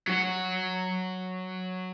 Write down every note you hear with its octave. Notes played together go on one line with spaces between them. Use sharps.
F#3 F#4